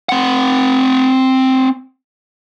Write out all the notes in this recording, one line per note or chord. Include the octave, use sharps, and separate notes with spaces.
C4 F#5